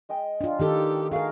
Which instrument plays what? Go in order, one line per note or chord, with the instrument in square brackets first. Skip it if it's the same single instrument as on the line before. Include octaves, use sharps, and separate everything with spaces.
[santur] G#3 D#5 G5
[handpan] D4 F4
[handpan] D#3 D#4 A4 [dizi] G4
[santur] A3 F#4 [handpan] G#4 A#4 [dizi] F5